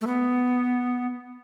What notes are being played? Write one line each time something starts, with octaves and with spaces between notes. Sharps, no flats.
A3
B3